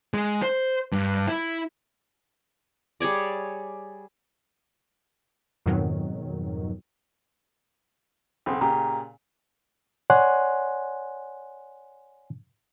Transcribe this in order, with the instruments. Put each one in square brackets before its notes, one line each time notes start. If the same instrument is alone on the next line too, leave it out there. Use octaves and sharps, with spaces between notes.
[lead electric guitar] G#3
C5
G2
E4
[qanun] G3 G#4 C#5 D5
[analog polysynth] F2 G#2 B2 D#3 F#3
[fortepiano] B1 C#3 C4
[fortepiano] A#2 C#3 G4 [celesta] A#5
[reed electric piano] C#5 D5 F#5 G#5 C6 F#6